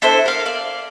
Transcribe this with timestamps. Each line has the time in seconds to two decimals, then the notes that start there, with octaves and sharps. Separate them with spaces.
0.02 D4 E4 A4 C5
0.26 A#4 F5
0.46 D5 F5